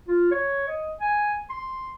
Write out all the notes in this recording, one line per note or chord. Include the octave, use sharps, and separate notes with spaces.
F4
C#5
D#5
G#5
C6